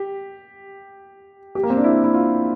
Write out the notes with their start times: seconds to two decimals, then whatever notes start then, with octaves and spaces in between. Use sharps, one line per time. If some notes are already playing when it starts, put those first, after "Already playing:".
Already playing: G4
1.55 G4
1.63 A#3
1.70 C4
1.77 D4
1.84 E4
2.04 E4
2.14 F4